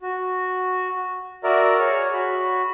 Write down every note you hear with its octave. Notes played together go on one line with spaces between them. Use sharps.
F#4
F#4 A#4 D5 E5 A#5
G#4 C#5 F6
F#4 B5